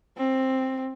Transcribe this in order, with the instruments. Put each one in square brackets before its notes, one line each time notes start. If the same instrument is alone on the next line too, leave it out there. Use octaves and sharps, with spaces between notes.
[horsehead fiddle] C4